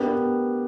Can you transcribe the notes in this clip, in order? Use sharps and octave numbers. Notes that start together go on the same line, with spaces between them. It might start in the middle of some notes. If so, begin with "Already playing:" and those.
Already playing: B3 D4 G4 A#4